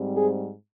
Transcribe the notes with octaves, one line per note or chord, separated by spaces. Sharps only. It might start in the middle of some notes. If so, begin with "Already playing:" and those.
Already playing: G#2 G3 C4
G#4